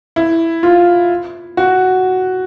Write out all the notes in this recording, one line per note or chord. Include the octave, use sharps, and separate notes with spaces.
E4
F4
F#4